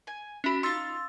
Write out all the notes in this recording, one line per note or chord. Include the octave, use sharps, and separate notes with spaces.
G#5
C#4 F#4 E5 B5
D#4 F4 C6 E6 A6